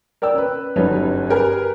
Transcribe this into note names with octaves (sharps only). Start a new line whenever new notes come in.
A#4 D5 G5 E6
C#4 B4
G1 F#2 G3 C#4 D#4 B4
G4 G#4 A#4 B4 G#5 A#5